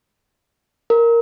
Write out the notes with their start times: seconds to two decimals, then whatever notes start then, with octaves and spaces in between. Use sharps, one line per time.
0.90 A#4